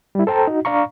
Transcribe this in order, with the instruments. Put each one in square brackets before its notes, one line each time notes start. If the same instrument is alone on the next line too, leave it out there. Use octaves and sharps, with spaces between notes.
[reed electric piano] G3 E4
A4 C5 G5 A5 A#5
D#4 F#4
D4 D5 F5 A#5 C#6